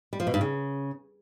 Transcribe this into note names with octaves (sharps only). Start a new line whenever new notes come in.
G3
F3
B2
G2
C#3